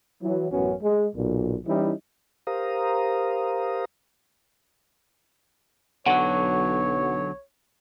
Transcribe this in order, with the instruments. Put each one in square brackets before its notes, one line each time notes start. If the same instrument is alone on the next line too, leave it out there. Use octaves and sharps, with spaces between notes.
[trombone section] E3 F#3
A1 F#2 B3 C#4 F#4
G#3
B1 A#2
E3 G3 C#4 D#4 E4
[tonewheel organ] G4 A#4 C5 F5 A#5 D#6
[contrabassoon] B1 [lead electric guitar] D3 F#3 [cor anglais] C#5 [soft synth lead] F#5